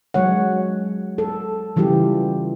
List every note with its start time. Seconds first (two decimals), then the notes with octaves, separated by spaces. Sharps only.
0.14 F#3 G#3 C#5 F#5
1.18 A4
1.76 C#3 E3 G3 F4 G4